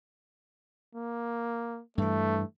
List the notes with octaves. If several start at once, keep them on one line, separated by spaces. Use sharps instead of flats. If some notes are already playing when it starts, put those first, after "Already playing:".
A#3
G2 E3 A3